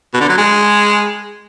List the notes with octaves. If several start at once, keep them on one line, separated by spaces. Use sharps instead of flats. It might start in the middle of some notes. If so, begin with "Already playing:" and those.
B2
D3
F#3
G#3